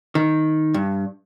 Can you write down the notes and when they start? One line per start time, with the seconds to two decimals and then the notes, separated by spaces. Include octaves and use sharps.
0.15 D#3
0.74 G2